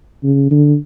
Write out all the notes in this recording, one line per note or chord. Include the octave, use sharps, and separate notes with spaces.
C#3
D3